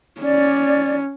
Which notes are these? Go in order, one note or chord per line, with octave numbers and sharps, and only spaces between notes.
C#4 D5